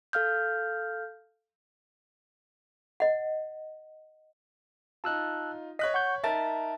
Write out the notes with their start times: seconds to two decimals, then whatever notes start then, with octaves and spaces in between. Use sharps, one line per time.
0.13 A4 F5 F6 G6
3.00 D#5 F#5
5.04 D#4 F4 A5 E6 F#6
5.79 C#5 D#5 F#6 B6
5.94 F#5 C#6 G6
6.24 D#4 A#4 E5 A5 A6